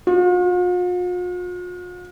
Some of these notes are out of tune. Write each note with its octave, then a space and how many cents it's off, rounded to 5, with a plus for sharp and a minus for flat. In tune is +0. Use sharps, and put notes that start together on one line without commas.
F4 +45